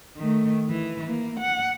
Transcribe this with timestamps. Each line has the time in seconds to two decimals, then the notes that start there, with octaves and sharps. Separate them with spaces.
0.17 D#3 A3
0.68 E3
1.08 A#3
1.40 F#5